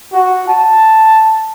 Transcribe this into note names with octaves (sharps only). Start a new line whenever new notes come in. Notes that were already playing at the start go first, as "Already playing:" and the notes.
F#4
A5